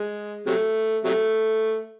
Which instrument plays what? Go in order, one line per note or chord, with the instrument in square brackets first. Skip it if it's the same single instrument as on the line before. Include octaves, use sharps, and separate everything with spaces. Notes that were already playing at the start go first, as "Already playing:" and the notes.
Already playing: [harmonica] G#3
C3 F#3 A3
C3 F#3 A3